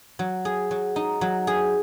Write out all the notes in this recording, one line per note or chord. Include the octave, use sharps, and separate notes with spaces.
F#3
G#4
F#3
D#4
F#3
G#4